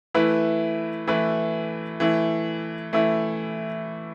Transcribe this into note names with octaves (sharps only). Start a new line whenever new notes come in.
E3 A3 E4 B4
E3 A3 E4 B4
E3 A3 E4
E3 A3 E4